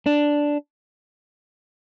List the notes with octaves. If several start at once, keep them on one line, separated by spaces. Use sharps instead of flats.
D4